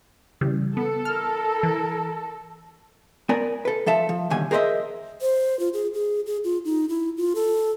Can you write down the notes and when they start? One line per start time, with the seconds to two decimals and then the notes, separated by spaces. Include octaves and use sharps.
0.41 C#3 E3 G3
0.77 B3 A4 F#5
1.05 E4 A#4 A5 F6
1.63 E3
3.29 B3 A#4 D5 G#5
3.65 A4 B4
3.86 F3 A4 E5 A5
4.09 F3
4.30 D#2 B2 D3 G3 G#5
4.51 G#4 A#4 C5 C#5 D#5 E5
5.21 C5
5.59 F4
5.73 G#4
5.94 G#4
6.26 G#4
6.44 F4
6.65 D#4
6.89 E4
7.17 F4
7.35 A4